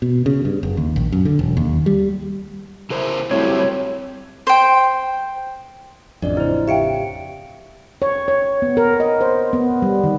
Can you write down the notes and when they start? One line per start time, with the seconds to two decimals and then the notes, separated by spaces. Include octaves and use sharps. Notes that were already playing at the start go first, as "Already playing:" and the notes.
0.02 B2
0.26 C#3
0.45 G2
0.63 F#1
0.77 D#2
0.96 A#1
1.12 F#2
1.25 D3
1.39 E1
1.57 D#2
1.86 G3
2.90 C#3 E4 A#4 C5
3.31 F#3 G3 A3 C4 E4 G4 C#5
4.47 C5 G5
6.22 A1 F2 D4 D5 D#5
6.37 C#3 E4 C5
6.68 G4 E5 F5 G5 C#7 D7
8.02 C#5
8.28 C#5
8.62 B3
8.77 A#4
9.00 D#5
9.21 C5
9.53 B3
9.82 G3
10.04 D#3